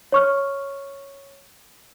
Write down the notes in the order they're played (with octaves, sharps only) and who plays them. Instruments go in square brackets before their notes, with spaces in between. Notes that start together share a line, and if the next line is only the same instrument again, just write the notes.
[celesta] C#5 C#6 F6